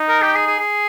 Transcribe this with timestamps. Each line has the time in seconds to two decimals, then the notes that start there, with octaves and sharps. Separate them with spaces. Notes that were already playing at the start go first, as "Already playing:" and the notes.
Already playing: D#4
0.09 A#4
0.22 G4
0.35 G#4
0.47 G#4
0.59 G#4